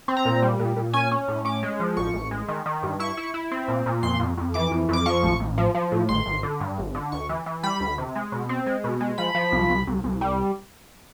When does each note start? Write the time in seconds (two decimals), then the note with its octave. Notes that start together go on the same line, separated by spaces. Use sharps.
0.08 C4
0.17 A#5
0.25 A#2
0.42 G3
0.59 A#2
0.76 A#2
0.93 C#4 G#5
1.11 C#4
1.28 A2
1.45 C#4 D6
1.63 G#3
1.80 F3
1.97 A1 C#6
2.14 A1
2.31 G#3
2.48 D#3
2.66 D#3
2.83 G2
3.00 E4 C#6
3.17 E4
3.34 E4
3.51 C4
3.68 A#2
3.86 A#2
4.03 F2 C6
4.20 F2
4.37 F2
4.54 E3 D6
4.72 F2
4.89 F2 D6
5.06 F3 C#6
5.23 A1
5.40 A1
5.58 F3
5.74 F3
5.92 A2
6.09 G#1 C6
6.26 G#1
6.43 D3
6.60 G2
6.78 G#1
6.95 D3
7.12 D2 C#6
7.29 E3
7.46 E3
7.63 G3 B5
7.80 D2
7.98 C3
8.15 G#3
8.32 B2
8.49 C4
8.66 G#3
8.84 B2
9.01 G#3
9.18 F3 B5
9.35 F3
9.52 C2
9.69 C2
9.87 C2
10.04 C2
10.21 G3